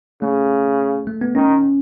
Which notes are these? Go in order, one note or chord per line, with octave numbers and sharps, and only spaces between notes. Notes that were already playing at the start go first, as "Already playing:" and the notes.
C#3 A3
A3
B3
D#3 C#4